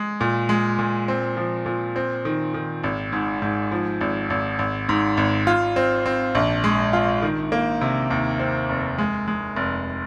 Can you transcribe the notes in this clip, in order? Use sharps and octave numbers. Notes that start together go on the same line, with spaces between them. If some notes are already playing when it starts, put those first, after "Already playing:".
Already playing: G#3
A#2
G#3
A#2
C4
F3
A#2
C4
D#3
D#3
G#1
G#2
G#2
F3
G#1
G#1
G#1
G#2
G#1
F4
C4
C4
A#1
G#3
F4
D#3
A#3
C3
D#2
C4
F1
G#3
G#3
F1